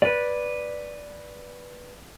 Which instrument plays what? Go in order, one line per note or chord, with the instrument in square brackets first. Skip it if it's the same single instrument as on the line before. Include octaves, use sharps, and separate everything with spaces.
[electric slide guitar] B4 D5